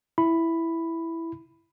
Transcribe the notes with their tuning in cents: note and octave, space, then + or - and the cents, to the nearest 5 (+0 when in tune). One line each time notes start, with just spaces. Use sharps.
E4 +0 B5 +5